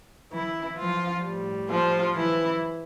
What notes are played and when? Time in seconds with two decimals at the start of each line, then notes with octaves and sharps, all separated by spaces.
0.32 E3 E4
0.78 F3 F4
1.24 A2 G3
1.69 F3 F4
2.15 E3 E4